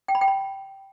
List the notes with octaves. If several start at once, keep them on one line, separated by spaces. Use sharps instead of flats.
G5
B5
G5
B5